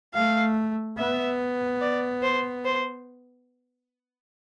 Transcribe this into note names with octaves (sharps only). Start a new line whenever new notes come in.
A3 F5
B3 E5
D5
C5
C5